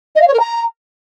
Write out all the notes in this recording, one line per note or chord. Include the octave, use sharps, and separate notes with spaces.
D#5
F5
C#5
A#4
A#5